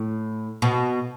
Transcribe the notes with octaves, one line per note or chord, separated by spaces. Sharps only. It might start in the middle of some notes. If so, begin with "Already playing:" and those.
Already playing: A2
B2